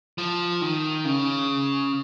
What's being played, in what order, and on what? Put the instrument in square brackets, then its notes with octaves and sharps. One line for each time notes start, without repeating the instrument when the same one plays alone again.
[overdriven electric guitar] F3
D#3
C#3